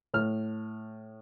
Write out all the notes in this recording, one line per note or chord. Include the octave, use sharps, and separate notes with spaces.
A2 F6